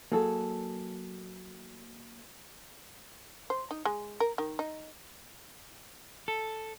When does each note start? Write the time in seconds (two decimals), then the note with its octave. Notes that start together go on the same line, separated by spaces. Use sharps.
0.12 F#3 A#3 G#4 A4
3.50 C5
3.71 D#4
3.85 G#3
4.20 A#4
4.38 D#3
4.59 D#4
6.28 A4